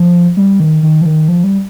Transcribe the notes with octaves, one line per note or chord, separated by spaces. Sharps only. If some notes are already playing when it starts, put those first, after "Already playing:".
Already playing: F3
G3
D#3
D#3
F3
D#3
F3
G3